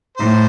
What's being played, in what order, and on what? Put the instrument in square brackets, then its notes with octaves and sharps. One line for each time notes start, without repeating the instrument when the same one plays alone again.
[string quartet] A2 [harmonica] C5